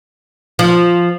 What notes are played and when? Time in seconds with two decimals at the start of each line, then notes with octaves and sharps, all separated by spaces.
0.59 F3